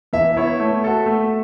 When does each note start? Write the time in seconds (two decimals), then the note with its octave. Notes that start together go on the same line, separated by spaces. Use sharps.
0.13 E3 E5
0.37 B3 E4 C#5
0.60 A3
0.84 F#4 A4
1.06 A3